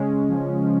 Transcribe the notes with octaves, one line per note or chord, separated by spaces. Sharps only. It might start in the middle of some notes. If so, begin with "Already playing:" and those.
Already playing: C#3 G#3 C#4
F3
F3